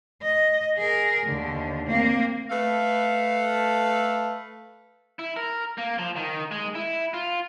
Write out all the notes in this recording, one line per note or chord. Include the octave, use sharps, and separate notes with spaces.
D#5
G#4 A#4
D#2 D3
A#3 C4
A3 A4 B4 F5
E4
A#4
A#3
F3
D#3
G#3
E4
F4